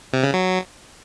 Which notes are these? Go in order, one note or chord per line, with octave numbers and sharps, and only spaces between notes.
C3
C#3
F#3